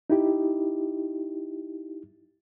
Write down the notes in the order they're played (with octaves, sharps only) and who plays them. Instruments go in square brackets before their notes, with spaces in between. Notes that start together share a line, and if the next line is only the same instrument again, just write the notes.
[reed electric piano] D#4 E4 G4